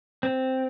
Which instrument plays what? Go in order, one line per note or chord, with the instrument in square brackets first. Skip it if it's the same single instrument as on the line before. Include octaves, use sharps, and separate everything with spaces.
[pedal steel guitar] C4